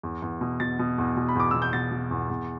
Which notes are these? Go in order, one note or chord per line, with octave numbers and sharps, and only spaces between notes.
E2
E2
B2
B2 A6
B2
E2
B2
B5
E2 D6
B2 E6
G6
B2 A6
B2
E2
E2